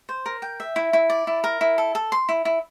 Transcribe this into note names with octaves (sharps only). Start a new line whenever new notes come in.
C5
A#4
G5
E5
E4
E4
D5
E4
A#4
E4
A4
A4
C6
E4
E4